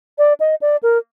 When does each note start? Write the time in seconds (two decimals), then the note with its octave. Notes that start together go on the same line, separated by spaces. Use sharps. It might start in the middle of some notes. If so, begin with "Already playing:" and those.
0.18 D5
0.40 D#5
0.61 D5
0.83 A#4